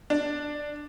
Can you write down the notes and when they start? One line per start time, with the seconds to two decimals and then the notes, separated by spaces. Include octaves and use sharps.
0.10 D4